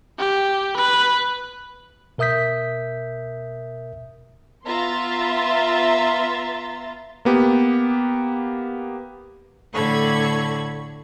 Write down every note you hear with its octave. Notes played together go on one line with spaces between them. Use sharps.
G4
B4
B2 A#4 E5 D#6 G6 B6
B3 F4 E5 A#5 C6 A6
A#3 B3 G4
A2 D3 A4 B5 C#6 G#6